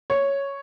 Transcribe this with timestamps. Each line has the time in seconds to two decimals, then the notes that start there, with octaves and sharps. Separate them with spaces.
0.10 C#5